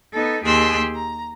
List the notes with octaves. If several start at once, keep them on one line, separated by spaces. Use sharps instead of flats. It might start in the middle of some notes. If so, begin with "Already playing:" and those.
B3 D#4 A4
D#2 G4 G#4 C6 E6 F#6
A#5